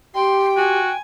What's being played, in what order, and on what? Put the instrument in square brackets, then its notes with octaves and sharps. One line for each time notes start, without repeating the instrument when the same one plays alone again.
[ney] G4 [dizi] G5 [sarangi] C6
[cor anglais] F#4 [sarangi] G#5